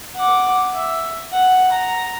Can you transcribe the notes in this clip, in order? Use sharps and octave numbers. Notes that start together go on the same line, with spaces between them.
F#5 D6
E5
F#5
A#5